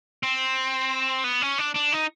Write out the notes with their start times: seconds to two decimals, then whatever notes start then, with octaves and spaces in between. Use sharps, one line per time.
0.23 C4
1.24 B3
1.42 C#4
1.58 D4
1.74 D4
1.92 D#4